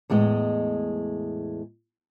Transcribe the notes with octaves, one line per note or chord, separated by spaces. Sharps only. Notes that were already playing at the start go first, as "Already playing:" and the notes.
E2 A2 G#3 D#5